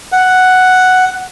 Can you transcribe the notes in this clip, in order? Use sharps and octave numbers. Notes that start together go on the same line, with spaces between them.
F#5